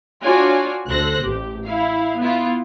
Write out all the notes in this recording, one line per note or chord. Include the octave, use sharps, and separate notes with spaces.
D4 F4 F#4 C#5 D5 G#5
D2 A4 C5 F#6 A#6
A1 G4
E4 F5
B3 E4 F4